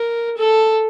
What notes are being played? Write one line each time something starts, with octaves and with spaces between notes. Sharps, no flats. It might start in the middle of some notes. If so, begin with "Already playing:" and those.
Already playing: A#4
A4